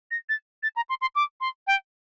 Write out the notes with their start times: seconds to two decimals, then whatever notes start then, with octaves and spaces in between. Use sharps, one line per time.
0.11 A#6
0.29 A6
0.63 A6
0.76 A#5
0.89 C6
1.01 C6
1.15 D6
1.41 C6
1.67 G5